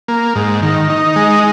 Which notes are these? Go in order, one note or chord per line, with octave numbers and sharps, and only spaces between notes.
A#3
G#2
D#3
D#4
G#3